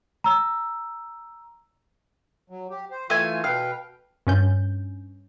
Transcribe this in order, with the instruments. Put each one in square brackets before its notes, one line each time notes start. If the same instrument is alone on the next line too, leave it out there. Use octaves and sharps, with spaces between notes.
[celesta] A#5 E6
[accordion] F#3
G4
C5
[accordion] E3 F4 [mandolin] A3 G#5
[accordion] B2 B4 G5 [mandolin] F5
[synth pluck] G2 C#4 G6